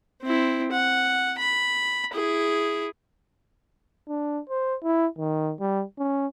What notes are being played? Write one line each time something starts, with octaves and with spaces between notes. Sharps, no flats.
C4 E4
F#5
B5
E4 G#4
D4
C5
E4
D#3
G3
C#4